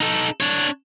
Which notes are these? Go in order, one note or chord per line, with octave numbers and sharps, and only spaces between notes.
D#4 A4
D4 C#5